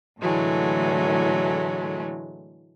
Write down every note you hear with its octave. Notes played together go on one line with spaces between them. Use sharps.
A2 D3 E3 F#3 G#3 A3